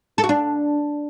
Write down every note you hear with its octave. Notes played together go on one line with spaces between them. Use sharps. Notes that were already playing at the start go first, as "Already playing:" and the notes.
A4
F#4
D4